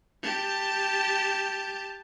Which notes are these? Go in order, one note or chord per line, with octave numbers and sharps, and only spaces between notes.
G4 A5